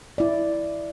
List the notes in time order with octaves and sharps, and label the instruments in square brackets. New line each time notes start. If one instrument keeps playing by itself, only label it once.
[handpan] E4 D5